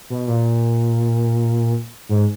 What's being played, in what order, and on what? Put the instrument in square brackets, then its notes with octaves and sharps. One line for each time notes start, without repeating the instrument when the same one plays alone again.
[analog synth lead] B2
A#2
G#2